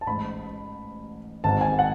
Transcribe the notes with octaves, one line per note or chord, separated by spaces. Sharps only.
A5
A1 G#2 B5
G#1 G#2 A5
G#5
F#5